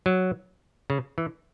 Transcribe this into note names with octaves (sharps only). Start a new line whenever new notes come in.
F#3
C#3
E3